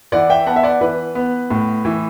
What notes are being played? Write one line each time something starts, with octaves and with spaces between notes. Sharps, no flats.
E3 D5 F#5
E5 G5
B3 F#5 A5
E5
D5 F#5
E3 B4
B3
A2
E3